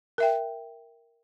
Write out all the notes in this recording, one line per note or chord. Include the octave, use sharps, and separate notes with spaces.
A#4 E5 G5